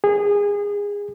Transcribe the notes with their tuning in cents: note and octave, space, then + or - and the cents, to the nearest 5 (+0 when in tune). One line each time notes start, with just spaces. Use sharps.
G#4 -25